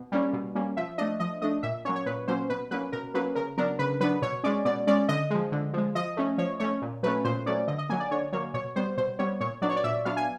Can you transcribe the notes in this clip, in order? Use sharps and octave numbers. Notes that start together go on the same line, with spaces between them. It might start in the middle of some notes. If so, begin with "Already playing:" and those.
Already playing: B2
G3 A#3 C#4
B2
G3 A#3 C#4
F3 E5
A3 D4 D#5
F3 D#5
A3 D4 D#5
A#2 E5
F#3 A#3 C#4 C#5
C#5
A#2 B4
F#3 A#3 C#4 C5
B2 B4
F#3 A#3 C#4 B4
B2 A#4
F#3 A#3 C#4 B4
C#3 A#4
F#3 B3 D4 A#4
C#3 B4
F#3 B3 D4 B4
B2 C#5
G#3 C#4 D5
B2 D5
G#3 C#4 D5
D3 D#5
F3 G#3
D3
F3 G#3
F3 D#5
A3 C#4
F3 C#5
A3 C#4 C#5
A#2
F#3 A3 C#4 B4
A#2 C5
F#3 A3 C#4 D5
D3 D#5
D#5
F#3 A#3 G#5
D5
D3 C#5
F#3 A#3 C#5
B2 C#5
G3 B3 C5
B2 C5
G3 B3 C#5
A#2 C#5
F#3 B3 D4 D5
C#5
D5
A#2 E5
F#3 B3 D4 F5
G#5